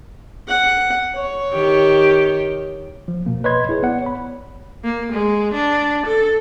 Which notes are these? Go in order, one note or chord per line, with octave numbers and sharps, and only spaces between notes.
F#5
C#5
D#3 G4
F3
B2 A#3
B4 C#5 D#5 B5 C6 G#6
E4 G#4 C#5
B3 D5 F#5
C#5 B5
A#3
G#3
D4
A4